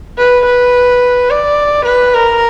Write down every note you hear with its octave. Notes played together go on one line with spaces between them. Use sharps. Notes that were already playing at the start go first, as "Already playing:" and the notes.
B4
B4
D5
B4
A#4